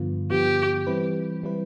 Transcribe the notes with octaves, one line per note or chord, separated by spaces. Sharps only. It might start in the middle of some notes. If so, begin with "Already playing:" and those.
Already playing: G2 D3 F3 B3 F4
G2 D3 F3 B3 F4 G4
E3 G3 C4 E4 B4
E3 G3 C4 E4 B4